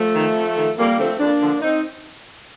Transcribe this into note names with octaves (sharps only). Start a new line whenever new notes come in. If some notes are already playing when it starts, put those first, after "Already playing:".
Already playing: F3 A3
D#3
F2
D#3
F2 G3 A#3
D3 F3 A3 C4
F2 A#3 D4
D3 F3
C4 D#4